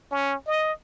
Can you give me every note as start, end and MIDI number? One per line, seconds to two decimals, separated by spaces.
0.11 0.35 61
0.47 0.72 75